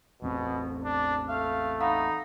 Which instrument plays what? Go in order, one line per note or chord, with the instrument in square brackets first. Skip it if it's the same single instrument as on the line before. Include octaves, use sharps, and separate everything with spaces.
[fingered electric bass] A1 E2 C4 [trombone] B2
[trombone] D4
[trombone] A3 [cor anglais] F5
[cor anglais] D#4 [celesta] F5 F#5 B5